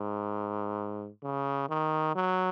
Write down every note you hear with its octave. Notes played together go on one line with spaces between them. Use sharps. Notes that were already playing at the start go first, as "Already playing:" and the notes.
Already playing: G#2
C#3
D#3
F#3